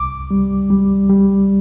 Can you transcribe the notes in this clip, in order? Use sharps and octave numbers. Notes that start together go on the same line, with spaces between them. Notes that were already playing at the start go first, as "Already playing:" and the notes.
Already playing: C2 D6
G3
G3
G3